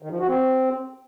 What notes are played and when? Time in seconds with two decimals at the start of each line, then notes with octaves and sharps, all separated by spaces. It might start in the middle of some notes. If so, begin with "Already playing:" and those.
0.02 D#3
0.11 F3
0.20 F#4
0.29 C4